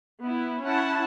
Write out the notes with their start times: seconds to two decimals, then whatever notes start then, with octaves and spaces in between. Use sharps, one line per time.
0.23 B3 E4
0.63 C#4 E4 F#5 A5